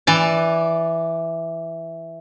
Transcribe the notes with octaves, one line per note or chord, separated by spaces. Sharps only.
E3 D5